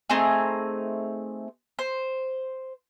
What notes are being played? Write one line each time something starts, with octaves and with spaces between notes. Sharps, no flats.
A3 C4 D#4 G#4
C5